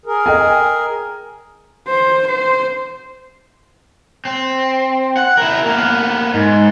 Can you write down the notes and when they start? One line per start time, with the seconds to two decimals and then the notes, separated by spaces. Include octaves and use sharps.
0.06 G#4 A#4
0.26 D#5 G5 G#5
1.87 C5
2.28 C5
4.25 C4
5.17 F#5
5.37 E4 A#4
5.66 A#3 B3
6.34 G#2